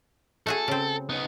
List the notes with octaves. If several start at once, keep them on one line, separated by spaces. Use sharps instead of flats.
A3 F#4 G#4 A4
C#3 C4
B3 D#4